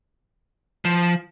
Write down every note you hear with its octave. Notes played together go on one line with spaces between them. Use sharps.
F3